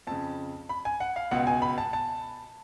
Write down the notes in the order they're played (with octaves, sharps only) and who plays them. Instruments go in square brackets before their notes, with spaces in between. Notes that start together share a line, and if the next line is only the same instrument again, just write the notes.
[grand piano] F2 C#3 A5
B5
G#5
F#5
F5
C#2 B2 F#5
G#5
B5
A5
A5